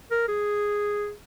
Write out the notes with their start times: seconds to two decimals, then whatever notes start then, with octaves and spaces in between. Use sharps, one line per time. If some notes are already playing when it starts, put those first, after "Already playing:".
0.11 A#4
0.28 G#4